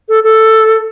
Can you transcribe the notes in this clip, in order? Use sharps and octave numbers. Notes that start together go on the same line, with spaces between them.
A4
A4